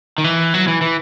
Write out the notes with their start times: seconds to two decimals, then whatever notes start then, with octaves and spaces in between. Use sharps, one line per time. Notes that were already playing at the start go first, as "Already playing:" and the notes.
0.18 D#3
0.24 E3
0.54 F#3
0.68 E3
0.81 E3